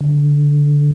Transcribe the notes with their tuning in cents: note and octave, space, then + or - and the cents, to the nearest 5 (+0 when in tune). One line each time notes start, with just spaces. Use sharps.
D3 -10